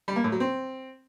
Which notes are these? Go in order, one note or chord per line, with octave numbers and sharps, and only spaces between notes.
G3
A#3
A2
F#3
C4